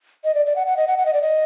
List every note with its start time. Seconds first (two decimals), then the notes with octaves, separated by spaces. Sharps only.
0.24 D#5
0.34 D5
0.46 D5
0.56 F#5
0.67 F#5
0.77 D#5
0.88 F#5
0.98 F#5
1.06 D#5
1.13 D5
1.22 D#5